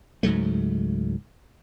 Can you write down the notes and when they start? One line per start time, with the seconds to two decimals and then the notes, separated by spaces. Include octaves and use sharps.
0.23 C#2 G#2 F#3 A3